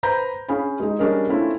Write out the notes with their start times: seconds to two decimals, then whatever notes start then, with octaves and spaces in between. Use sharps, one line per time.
0.03 B4 C5 A#5 B5 G6
0.49 C#4 G#4 F5 G#5 B5
0.80 G#3 D#4
0.99 G3 C#4 D4 G#4 A#4 D#5
1.29 A3 C4 C#4 E4 F4